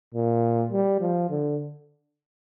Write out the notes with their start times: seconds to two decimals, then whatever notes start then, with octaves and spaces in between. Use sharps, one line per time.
0.14 A#2
0.72 G3
1.00 F3
1.30 D3